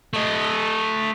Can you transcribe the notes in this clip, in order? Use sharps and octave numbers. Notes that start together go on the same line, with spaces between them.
A3 D#5